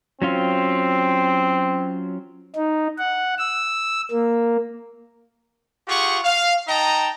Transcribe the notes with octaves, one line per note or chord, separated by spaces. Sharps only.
F#3 C4 C#4 F4
D#4
F#5
E6
A#3
F4 G4 G#4 F#5 C#6
F5
D#4 D#5 G5 A5 A#5